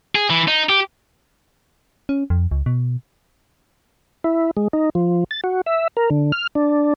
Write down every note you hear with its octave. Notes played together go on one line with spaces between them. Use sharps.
G#4
E3
D#4
G4
C#4
F2
C#2
B2
E4
G#3
D#4
F3
A6
F#4
E5
A#4
D3
F6
D4